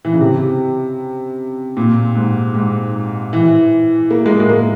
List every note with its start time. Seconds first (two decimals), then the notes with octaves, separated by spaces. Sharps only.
0.05 E3
0.13 C#3
0.21 C3
1.77 A#2
2.15 G#2
2.55 G#2
3.33 E3
4.11 A#3
4.26 G#3
4.30 A#3
4.40 G#3
4.49 A#3